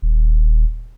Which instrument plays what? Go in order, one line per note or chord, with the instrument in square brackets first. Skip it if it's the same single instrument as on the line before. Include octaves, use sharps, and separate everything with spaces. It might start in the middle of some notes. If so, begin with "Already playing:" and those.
[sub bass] D#1